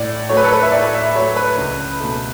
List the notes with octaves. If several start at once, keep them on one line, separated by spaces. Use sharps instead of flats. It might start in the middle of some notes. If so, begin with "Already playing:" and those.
Already playing: A2 D5
F#3 A3 C#5
B4
A4
B4
E5
A2 D5
E5
F#3 A3 C#5
B4
C#2
B2 A3